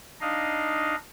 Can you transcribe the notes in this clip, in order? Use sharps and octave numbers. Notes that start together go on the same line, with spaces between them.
D4 D#4 D#5 F5